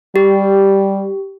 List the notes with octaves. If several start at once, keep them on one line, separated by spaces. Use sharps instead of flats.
G3 G4